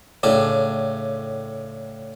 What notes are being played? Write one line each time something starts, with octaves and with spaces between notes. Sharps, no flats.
A2 C#3 D4